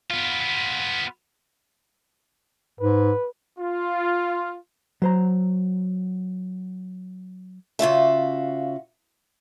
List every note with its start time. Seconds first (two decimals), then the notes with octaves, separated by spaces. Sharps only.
0.11 B3 F4
2.80 G#2 B4
3.59 F4
5.02 F#3 C5 A#5
7.79 C#3 F4 F#4 E5